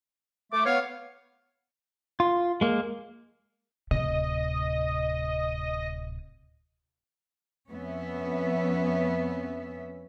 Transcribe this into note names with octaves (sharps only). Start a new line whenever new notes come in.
A3 D6
B3 C#5 F5
F4
G#3 A#3
D1 C3 D#5
F2 B3 C#4 E5